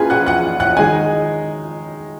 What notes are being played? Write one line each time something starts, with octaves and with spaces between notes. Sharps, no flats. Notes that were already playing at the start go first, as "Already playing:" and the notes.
Already playing: A#3 C#4 F4 G#4 B4 G#5
F#5 F#6
F#5 F#6
F#5 F#6
D#3 G#3 D#4 G#5 G#6